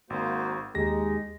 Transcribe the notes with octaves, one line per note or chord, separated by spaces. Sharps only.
G#1 A#3 F#4 C5
D#2 G#3 D#4 G4 A#6